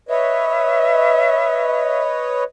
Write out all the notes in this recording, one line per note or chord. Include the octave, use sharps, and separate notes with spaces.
B4 C#5 D#5 E5